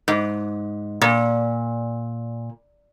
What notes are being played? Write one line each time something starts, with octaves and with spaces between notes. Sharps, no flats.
G#2
A#2